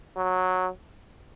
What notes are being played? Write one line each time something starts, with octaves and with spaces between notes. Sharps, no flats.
F#3